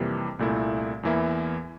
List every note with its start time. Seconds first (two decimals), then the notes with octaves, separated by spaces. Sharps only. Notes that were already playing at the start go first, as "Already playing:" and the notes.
Already playing: F2 C3 E3 G3 A#3
0.39 C2 A#2 A3 E4
1.03 E2 E3 A#3 E4